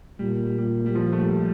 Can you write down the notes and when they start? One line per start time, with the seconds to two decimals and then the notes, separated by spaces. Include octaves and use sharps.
0.19 A#2 G3
0.58 G3
0.86 G3
0.95 F3
1.12 A3
1.20 G3